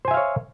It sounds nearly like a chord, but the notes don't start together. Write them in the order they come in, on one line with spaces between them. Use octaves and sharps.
C5 G#5 E5 F5 C#5